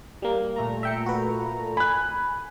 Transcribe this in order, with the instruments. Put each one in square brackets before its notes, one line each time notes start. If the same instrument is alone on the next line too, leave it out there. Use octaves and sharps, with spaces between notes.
[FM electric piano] G3 A#3
[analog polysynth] A#2 A3 A#5
[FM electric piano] E5 G5 C#7
F#4 B4
[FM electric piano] G#5 [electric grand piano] B5 F#6